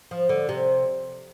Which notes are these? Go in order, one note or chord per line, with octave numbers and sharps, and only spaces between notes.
F3
D3
C3